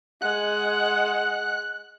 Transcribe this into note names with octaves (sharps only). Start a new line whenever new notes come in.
G#3 F#5 F#6